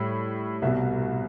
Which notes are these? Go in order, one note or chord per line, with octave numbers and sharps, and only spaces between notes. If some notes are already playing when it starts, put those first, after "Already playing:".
Already playing: A2 G3 B5
C2 B2 G3 E5